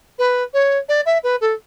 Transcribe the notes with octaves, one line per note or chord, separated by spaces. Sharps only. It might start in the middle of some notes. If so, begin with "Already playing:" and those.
B4
C#5
D5
E5
B4
A4